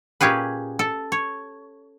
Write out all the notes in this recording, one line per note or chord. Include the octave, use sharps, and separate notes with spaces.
A#2 C#4 G4 G#4 B4
A4
C#5